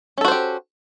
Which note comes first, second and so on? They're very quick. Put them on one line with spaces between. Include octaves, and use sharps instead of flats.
C#4 A4 F#4 C5 G4